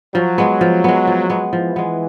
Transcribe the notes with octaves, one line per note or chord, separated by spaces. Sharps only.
F3 F#3
G#3 B3
F3
G#3 B3
F3
G#3 B3
E3 F3
G#3 B3